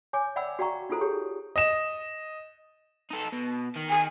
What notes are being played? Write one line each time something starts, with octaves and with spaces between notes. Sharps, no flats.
C#5 G#5 D6
D5 E5 F#5 G5 B5 E6
F#4 D5 F5 G5 A#5 C#6
D#4 F4 F#4 A4 C5 A#5
G4 G#4 C#5
D#5 E7
D#4 A4
B2
D#3
G#5